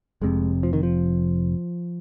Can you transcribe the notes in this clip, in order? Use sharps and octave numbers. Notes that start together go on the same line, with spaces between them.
F1 F2 C3 G#3
F3
D#3
F3